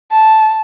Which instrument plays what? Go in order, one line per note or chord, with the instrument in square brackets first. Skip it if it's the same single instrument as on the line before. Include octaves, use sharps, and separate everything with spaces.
[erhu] A5